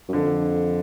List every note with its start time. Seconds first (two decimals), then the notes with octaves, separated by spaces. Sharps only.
0.09 F#2
0.13 F2 D3